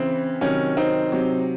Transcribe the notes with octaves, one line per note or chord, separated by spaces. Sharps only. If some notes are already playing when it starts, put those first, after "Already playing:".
Already playing: C#3 E3 C4
C3 D#3 F#3 C#4
C4 D#4
C3 F#3